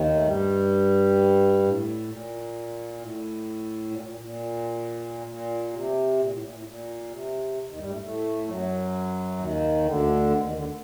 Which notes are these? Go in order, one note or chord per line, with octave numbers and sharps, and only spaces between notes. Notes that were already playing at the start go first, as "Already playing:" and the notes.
Already playing: D#2 D#3
A3
G2 G3
A2
A#2
A2
A#2
A#2
A#2
A#2
C3
A#2
A2
A#2
A2
A#2
C3
D#2 D#3
G2 G3
A2 A3
A2 A3
F#2 F#3
D#2 D#3
D2 D3
D#2 D#3
D#2 D#3
D2 D3